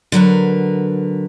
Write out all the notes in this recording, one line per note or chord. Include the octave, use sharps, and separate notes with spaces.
D3 F#3 A#4 B4